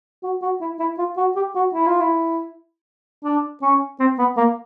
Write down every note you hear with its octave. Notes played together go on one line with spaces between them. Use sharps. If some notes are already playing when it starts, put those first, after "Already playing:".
F#4
F#4
E4
E4
F4
F#4
G4
F#4
E4
F4
E4
D4
C#4
C4
B3
A#3